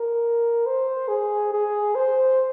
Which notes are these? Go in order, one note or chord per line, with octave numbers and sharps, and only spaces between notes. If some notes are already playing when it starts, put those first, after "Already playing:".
Already playing: A#4
C5
G#4
G#4
C5